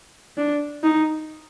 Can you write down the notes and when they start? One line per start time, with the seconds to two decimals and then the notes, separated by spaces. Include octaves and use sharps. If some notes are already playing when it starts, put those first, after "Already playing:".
0.37 D4
0.83 D#4